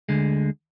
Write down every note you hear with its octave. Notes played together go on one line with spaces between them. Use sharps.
D2 D3 G#3